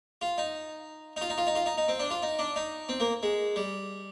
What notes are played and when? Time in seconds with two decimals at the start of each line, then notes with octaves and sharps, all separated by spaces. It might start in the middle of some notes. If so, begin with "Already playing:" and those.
0.22 F4
0.38 D#4
1.17 D#4
1.21 F4
1.30 D#4
1.38 F4
1.47 D#4
1.55 F4
1.66 D#4
1.78 D#4
1.88 C4
2.00 D4
2.10 F4
2.23 D#4
2.39 D4
2.56 D#4
2.89 C4
3.00 A#3
3.23 G#3
3.56 G3